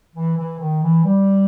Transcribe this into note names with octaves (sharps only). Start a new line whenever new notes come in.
E3
E3
D#3
E3
G3